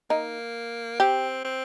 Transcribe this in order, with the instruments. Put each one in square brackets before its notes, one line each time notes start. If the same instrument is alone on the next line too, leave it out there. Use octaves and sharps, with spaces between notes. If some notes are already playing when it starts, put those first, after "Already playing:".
[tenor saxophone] A#3 [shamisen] D#4
[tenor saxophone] C4 [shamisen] G4
[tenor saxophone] C4